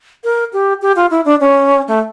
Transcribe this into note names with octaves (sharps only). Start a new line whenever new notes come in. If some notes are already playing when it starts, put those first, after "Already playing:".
A#4
G4
G4
F4
E4
D4
C#4
A3